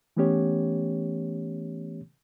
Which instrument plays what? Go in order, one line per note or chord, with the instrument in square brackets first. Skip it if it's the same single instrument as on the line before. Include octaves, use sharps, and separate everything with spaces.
[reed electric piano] E3 A3 B3 C#4 G4 C#5